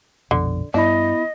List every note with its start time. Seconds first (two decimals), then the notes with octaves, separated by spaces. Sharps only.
0.31 A#1 F2 B2 D3
0.74 G2 B3 D4 E4 D#5 B5